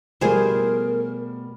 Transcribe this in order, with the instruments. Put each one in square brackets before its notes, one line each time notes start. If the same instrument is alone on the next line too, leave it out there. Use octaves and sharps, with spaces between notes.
[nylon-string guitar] B2 A3 B3 [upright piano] F3 G3 [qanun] G#4 C5 [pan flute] A#4